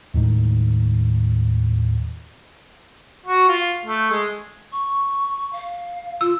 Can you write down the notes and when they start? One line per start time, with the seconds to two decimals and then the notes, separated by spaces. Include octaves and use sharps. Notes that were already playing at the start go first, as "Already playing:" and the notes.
0.14 D#2 A2 D#3 G#3
3.26 F#4
3.48 F4
3.85 A3
4.10 G#3
4.72 C#6
5.53 F5
6.21 F4 E6